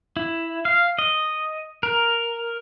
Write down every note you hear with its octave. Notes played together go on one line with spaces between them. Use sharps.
E4
F5
D#5
A#4